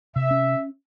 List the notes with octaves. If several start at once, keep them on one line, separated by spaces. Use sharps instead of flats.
C3 E5
C#4